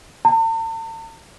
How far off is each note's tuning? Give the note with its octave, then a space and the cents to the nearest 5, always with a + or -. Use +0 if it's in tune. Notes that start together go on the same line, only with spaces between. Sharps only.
A5 +45